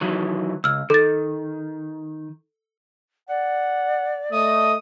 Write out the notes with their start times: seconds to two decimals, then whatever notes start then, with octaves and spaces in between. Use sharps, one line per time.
0.01 D#3 E3 F#3
0.64 C#2 E6 F6
0.90 D#3 A4 A6
3.29 D5 F#5
4.32 A3 D#5 D#6